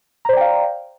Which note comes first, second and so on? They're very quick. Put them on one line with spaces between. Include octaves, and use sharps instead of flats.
A#5 C5 D5 G5 F5